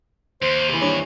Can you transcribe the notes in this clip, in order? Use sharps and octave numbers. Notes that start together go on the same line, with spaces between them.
D#2 C5
C3 E3
G2 C#5